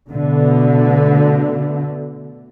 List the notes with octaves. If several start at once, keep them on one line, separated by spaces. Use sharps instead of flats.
B2 D3 A3